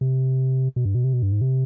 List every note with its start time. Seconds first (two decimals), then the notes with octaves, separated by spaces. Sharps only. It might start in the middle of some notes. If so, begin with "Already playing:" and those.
0.01 C3
0.76 B2
0.85 G2
0.95 B2
1.04 C3
1.13 B2
1.23 G2
1.32 G#2
1.41 C3